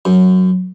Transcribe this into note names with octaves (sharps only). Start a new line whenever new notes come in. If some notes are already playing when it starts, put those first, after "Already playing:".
F#2